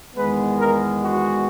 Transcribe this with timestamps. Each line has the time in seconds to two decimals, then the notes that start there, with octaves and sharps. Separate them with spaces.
0.15 E2 D#3 G#3 B3 B4
0.59 A#4
1.02 F#4